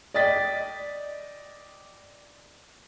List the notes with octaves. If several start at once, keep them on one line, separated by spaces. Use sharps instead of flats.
D5 D#5 G5 A6 B6